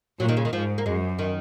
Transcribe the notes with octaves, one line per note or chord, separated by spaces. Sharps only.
A#2 F#3
D#3
C#3
D#3
G#2 F3
A#3
F#2 G#3
D#3